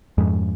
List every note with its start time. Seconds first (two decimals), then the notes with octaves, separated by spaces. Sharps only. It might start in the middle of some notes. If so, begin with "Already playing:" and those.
0.18 F2 G#2